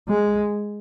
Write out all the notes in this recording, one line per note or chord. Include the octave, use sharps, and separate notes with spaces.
G#3